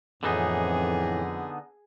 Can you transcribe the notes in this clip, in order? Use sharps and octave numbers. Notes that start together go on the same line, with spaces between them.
F2 A2 D3 E3 B3 D#4 G#4